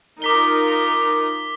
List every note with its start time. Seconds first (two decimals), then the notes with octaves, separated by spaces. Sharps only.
0.22 D#4 F4 A#4 D6 B6 G7